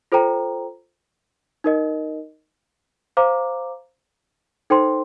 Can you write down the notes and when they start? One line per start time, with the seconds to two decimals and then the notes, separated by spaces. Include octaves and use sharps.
0.12 F4 A4 C5 G5 A#5
1.64 D#4 A#4 D#5
3.17 C5 F5 A#5 D6
4.70 D#4 A4 C5 G5 C6